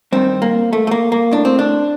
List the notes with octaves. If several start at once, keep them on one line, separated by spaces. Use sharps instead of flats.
G2 D#3 C4
A#3
A3
A3
A#3
A#3
A2 D4
C4
D4